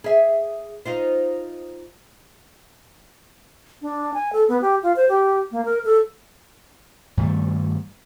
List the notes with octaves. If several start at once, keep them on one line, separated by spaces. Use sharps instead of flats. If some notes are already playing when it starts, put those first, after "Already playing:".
G#4 E5
D#4 F4 C5
D4
G#5
A4
B3
G4
F4
C5
G4
A#3
A#4
A4
G2 D#3 G3 A3